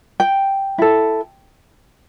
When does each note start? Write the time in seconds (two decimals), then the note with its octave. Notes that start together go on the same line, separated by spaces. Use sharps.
0.20 G5
0.78 E4 A4